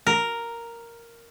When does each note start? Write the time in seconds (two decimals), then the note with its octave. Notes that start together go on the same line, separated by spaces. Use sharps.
0.07 A#4